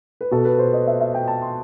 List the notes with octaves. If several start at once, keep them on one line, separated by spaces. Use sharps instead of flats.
B4
B2 A4
B4
C5
D#5
E5
E5
G5
A5
C6